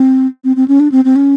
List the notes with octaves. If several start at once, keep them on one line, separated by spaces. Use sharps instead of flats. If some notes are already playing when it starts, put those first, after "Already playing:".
Already playing: C4
C4
C4
C#4
D4
C4
C4
C#4